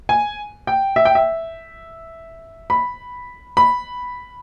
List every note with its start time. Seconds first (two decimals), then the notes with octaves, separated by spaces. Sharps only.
0.09 G#5
0.67 G5
0.96 E5
1.05 G5
1.15 E5
2.70 B5
3.57 B5